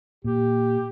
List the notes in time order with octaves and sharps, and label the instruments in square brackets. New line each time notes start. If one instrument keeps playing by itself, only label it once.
[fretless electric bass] A#2 [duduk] G4